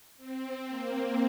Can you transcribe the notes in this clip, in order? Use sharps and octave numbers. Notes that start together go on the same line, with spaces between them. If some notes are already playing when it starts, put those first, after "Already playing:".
C4
A#3